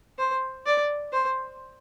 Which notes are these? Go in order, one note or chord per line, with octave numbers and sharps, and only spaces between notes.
C5
D5
C5